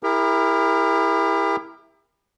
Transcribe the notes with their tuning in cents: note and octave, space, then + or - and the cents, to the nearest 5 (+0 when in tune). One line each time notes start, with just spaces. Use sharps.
E4 +0 G4 +40 A#4 +0